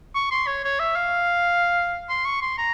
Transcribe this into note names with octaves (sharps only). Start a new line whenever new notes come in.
C#6
C6
C#5
C#5
E5
F5
C6
C#6
C6
A#5